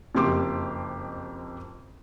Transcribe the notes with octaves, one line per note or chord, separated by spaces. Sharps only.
F#1 F2 G4 C6 D6